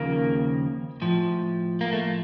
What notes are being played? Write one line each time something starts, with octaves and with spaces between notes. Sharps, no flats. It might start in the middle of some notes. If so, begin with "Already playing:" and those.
Already playing: D#2 C#3 F3 A#3
A2 F3
A#3
A3